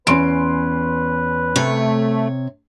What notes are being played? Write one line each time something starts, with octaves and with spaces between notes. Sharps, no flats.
E2 C#4 B4 C6 D7
C3 A3 C#5